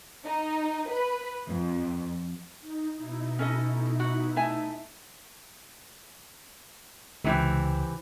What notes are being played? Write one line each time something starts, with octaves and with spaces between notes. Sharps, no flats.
D#4
B4
F2
D#4
B2 D#4 E4
C#4 A4 D#5
F#4
A3 E5 G#5
C#2 C3 E3 C4